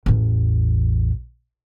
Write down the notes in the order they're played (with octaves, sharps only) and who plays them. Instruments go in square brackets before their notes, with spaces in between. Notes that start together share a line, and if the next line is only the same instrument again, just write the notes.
[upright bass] A1 E2